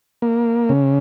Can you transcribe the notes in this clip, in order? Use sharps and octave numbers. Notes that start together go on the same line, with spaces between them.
A#3
C#3